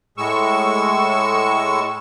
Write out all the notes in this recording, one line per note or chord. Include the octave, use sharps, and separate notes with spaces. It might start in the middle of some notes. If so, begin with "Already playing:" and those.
A2 G#3 C#6 E6